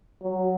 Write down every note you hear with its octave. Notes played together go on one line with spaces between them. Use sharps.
F#3